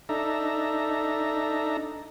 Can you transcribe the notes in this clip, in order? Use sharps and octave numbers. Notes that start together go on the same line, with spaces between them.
D4 D#4 A4 E5 A#5